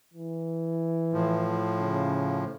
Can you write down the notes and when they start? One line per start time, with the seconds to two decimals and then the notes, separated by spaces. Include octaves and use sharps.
0.14 E3
1.13 A2 F3
1.78 C#3